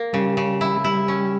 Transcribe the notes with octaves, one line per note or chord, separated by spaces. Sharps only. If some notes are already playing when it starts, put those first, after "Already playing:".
Already playing: A#3
C#3 G3
C#3
E4
G3 E4
C#4